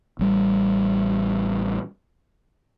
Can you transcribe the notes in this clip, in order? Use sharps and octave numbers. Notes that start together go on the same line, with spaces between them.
A1 G3